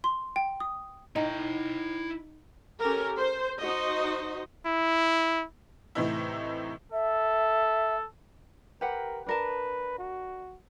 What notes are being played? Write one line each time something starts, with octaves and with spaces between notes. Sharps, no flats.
C6
G5
D#6
D#4 E4 G5
C#4 G4 A4 A#4
C5
D#4 F#4 C5 D#5
E4
A2 C3 E3 D#4 E4
A4 E5
G4 A#4 B4 F#5
D4 A#4 B4 A5
F#4